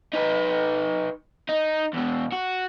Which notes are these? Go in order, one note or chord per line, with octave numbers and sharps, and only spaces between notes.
D#4 B4
D#4
E2 B2
F#4